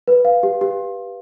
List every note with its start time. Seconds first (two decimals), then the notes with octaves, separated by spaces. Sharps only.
0.08 B4
0.25 F5
0.43 G4
0.61 G4